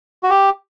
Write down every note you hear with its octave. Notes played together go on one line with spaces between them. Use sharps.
F#4
G4